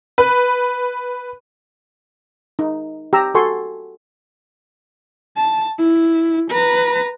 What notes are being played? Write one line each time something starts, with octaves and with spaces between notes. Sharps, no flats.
B4
D#4
G4 A#5 E6
F#4 A4 G#5 C6 C#6
A5
E4
B4 A#5